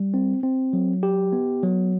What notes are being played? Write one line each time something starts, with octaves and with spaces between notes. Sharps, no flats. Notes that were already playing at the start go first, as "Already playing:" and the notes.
Already playing: G3
C4
C4
F#3
G4
B3
F#3